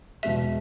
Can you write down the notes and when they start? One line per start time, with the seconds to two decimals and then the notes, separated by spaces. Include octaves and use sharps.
0.23 E2 B2 G#3 E5